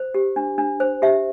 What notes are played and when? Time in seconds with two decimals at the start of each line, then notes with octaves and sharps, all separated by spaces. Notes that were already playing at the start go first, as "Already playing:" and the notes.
Already playing: C5
0.14 G4
0.36 D4
0.58 D4
0.80 C5
1.02 G4 E5